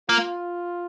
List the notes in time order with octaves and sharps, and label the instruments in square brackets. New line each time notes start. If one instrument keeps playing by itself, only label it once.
[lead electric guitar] A#3 [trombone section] F4